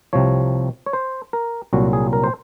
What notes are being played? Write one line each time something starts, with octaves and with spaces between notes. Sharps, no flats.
C2 C3 F3 C#5
C#5
C5
A#4
C2 A#2 F#3 F#4
G#4
A#4
C5